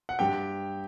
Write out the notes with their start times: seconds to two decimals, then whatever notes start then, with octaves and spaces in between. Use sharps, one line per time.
0.09 F#5
0.19 G2 G4 G5